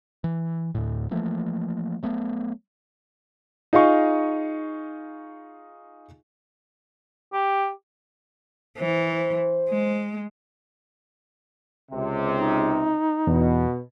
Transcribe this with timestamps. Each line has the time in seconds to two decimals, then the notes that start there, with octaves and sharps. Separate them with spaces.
0.24 E3
0.75 D2 A2
1.11 E3 F3 A3 A#3
2.03 F#3 A3 B3
3.73 D#4 F4 G#4 D#5 F5 C#6
7.33 G4
8.78 E3 C5
9.70 G#3
11.91 C#2 C3
12.37 D#4
13.27 E2 B2